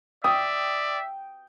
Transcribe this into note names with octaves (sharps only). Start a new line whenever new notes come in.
D5 E5 G5 D#6